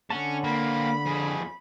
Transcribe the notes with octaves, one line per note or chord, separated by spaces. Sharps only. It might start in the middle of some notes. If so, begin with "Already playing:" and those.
D3 C#4 F#5 A5
A#3 C4 B5
F2 G#4